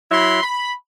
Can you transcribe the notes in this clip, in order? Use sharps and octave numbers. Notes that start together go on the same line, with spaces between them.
F#3 E4 B5 C6
B5